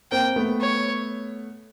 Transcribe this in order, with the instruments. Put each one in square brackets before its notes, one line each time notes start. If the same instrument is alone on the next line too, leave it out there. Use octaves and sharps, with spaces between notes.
[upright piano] A#3 C4 [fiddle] G5
[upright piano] A3 B3
[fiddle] C#5